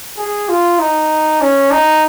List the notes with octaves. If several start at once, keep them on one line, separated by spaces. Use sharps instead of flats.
G#4
F4
D#4
C#4
D#4